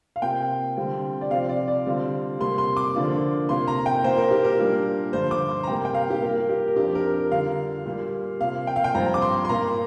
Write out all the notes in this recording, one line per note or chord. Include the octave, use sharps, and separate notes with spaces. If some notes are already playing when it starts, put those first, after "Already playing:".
F5
C3 A#3 F4 G5
D3 G3 C4 F4
D5
C3 F3 C4 F4 F5
D5
D5
D3 G3 C4 F4
C3 G3 A#3 C6
C6
D6
D3 F3 A#3 D4 F4
C3 A#3 F4 C6
A#5
G5
A#2 A#3 F4 C5
A#4
G4
A#4
A#2 G3 A#3 D4 F4
G2 D3 F3 C5
D6
C6
A#5
C3 G3 A#3 G5
G5
F5
G4
A#2 G3 A#3 F4 A#4
G4
A#4
F2 F3 D4 F4 G4
A#4
A#4
D3 G3 D4 F4 F5
A#2 G3 A#3
C3 A#3 F4 F5
G5
F5
G5
G2 F3 C4 F4 A#5
D6
C6
C6
A#2 A#3 F4 A#5